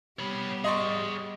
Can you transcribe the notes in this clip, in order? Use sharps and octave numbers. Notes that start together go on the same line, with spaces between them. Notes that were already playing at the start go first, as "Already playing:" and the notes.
G3 B3 C#5 B5
G#4 D5 D#5 C6 C#6